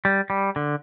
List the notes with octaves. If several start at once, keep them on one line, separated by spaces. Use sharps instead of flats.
G3
G3
D3